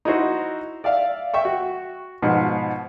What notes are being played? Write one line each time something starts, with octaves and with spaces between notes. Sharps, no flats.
D#4 E4 F#4 C5
D5 E5 F5
E5 G5 C#6
F#4
G#2 B2 F3